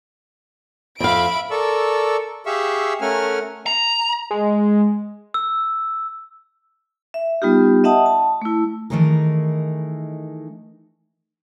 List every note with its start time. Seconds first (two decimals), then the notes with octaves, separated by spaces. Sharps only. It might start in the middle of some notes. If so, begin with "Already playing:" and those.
1.00 F2 E5 F5 B5 D7
1.51 A4 A#4 D5 C#6 E6
2.46 G4 G#4 E5 F5 C#6 E6
3.01 A3 C#4 A#4 F#5 G#5 F6
3.66 A#5
4.31 G#3
5.34 E6
7.14 E5
7.42 G3 B3 D#4 F4 G4
7.84 D#5 E5 F#5 A5 D#6
8.06 A5
8.42 A3 E4
8.90 D#3 E3 A3 D#4 G#4 A#4